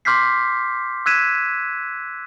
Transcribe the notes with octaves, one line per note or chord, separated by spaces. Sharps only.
C6 D6 F6 G6 B6 C7
E6 F#6 G#6 B6 D#7 E7